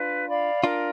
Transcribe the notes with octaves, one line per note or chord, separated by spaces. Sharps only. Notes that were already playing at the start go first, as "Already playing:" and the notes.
Already playing: D4 F4 B4
D5 F5 B5
D4 F4 A#4